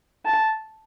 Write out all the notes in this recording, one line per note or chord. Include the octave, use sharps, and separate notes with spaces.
A5